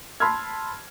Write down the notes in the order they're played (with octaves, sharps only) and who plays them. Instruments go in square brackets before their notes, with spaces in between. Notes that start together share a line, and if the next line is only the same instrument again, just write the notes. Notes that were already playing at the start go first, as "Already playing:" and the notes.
[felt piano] A5 B5 C6 E6 F6 G#6